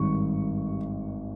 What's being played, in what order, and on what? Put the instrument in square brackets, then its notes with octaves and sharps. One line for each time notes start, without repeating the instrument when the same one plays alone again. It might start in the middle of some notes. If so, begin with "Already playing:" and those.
Already playing: [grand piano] G#1 G2 D#3 C#6